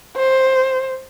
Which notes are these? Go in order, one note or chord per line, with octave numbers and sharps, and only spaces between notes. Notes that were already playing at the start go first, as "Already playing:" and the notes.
C5